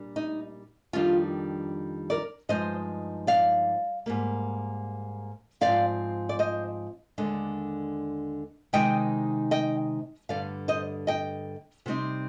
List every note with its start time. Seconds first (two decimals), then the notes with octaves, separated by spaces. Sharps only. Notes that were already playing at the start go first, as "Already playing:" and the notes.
Already playing: A#2 G3 D4
0.16 D#4
0.93 F2 D#3 G3 D4 F4
2.10 A#4 D5
2.49 G2 F3 G#3 D#4 C5 D#5
3.27 D5 F5
4.06 G#2 G3 A#3
5.61 G#2 F3 C4 D5 F5
6.29 D5
6.39 C5 D#5
7.18 D#2 D3 G#3 D4
8.73 C3 D#3 G#3 D#4 D#5 G5
9.51 D#5 G5
10.29 G2 D3 G3 D5 F5
10.68 C5 D#5
11.07 D#5 G5
11.86 C3 G3 C4 D#4